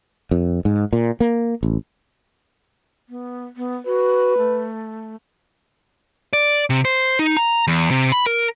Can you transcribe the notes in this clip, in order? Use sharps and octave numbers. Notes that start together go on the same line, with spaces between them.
F2
G#2
A#2
A#3
A1
B3
B3
F#4 B4
A3
D5
C3
C5
D#4
A#5
E2
C3
B5
A#4